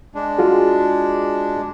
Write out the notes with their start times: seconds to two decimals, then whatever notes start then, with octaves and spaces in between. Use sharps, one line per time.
0.15 G#3 D4
0.38 F4 F#4 G#4